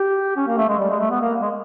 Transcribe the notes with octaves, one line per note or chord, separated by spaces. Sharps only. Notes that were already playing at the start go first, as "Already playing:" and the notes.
Already playing: G4
C#4
A#3
A3
G#3
G3
G#3
A3
B3
A#3
G#3